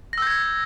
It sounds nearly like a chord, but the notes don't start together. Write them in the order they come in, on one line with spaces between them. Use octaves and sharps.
A#6 E6 G6 G#6